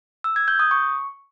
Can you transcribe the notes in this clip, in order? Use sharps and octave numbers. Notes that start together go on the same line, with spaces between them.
E6
G#6
G6
D#6
C#6